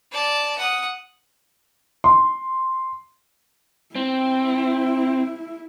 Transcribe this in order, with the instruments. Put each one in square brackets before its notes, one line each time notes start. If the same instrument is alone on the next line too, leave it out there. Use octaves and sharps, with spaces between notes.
[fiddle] D5 A5
F#5 D#6
[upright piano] C6
[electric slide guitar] C4 [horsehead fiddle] E4